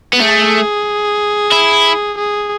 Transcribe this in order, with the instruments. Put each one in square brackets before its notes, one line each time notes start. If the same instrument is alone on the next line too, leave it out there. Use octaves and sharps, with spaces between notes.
[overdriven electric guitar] B3
[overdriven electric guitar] A3 [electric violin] G#4
[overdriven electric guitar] E4
[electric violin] G#4